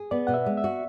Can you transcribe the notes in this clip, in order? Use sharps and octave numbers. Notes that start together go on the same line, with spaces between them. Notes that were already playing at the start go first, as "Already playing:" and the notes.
Already playing: G#4
B3 D5
B2 F#5
E5
G#3
E5
F#4